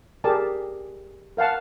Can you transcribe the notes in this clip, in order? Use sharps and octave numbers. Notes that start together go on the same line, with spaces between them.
G4 G#4 A#4 D5 A5
A#4 F5 F#5 A5